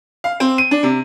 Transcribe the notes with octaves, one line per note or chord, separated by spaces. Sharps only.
F5
C4
D#7
D4
C3